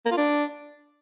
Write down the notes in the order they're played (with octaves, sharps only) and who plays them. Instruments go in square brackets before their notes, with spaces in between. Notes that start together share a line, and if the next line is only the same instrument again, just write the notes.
[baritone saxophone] A#3
F4
D4